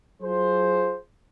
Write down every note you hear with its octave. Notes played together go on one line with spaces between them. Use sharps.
F#3 F4 G#4 C5